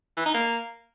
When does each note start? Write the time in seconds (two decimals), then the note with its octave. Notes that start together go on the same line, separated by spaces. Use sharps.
0.17 E3
0.25 D#4
0.34 A#3